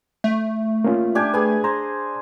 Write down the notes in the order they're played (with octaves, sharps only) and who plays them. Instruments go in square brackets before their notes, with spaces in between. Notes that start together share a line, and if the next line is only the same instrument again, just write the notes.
[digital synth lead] A3
[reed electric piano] A#3 C#4 F4
[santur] D4 G4 G#5
[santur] G#4 G#5 [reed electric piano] B4
[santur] C5 [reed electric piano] A#5